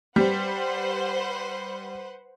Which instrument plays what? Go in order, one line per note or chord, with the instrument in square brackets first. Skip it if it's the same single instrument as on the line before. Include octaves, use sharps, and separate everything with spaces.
[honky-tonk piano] G3 [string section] B4 C5 F#5